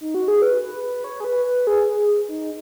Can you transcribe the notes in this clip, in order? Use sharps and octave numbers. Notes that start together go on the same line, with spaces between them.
D#4
F#4
G#4
B4
B4
B4
C#5
G#4
B4
B4
G#4
G#4
D#4